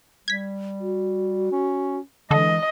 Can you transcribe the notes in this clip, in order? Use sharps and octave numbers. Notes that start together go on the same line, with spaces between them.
G3 G#6 B6
F#4
C#4
D3 E3 G#3 A4 D#5